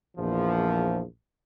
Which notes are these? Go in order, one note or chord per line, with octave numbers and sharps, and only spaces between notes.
A#1 E2 A#2 F3